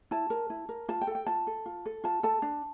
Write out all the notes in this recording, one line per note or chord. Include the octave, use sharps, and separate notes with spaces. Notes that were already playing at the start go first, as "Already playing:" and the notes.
E4 A5
A#4
E4
A#4
F4 A5
G5
A4
G5
F4 A5
A4
F4
A4
F4 A5
A4 A5
D4